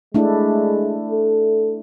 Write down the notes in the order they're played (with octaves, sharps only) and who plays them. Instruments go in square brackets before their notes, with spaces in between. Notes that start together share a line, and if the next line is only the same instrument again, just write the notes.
[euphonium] G#3 [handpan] A3 D4 E4
[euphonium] A4